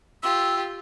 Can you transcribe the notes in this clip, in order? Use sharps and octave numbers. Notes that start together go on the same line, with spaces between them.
F4 G4 E6